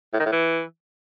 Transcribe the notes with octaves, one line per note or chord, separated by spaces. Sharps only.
A2
D#3
A2
E3